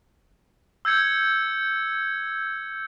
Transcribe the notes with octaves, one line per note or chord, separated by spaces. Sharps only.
E6 G6 G#6 C#7